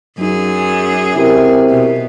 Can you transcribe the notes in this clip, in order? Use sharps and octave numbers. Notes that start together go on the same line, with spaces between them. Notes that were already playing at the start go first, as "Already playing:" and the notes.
F#2 F#3 D#4 G#4
C3 E4 G4 A#4
B2